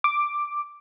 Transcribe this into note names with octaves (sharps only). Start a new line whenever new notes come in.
D6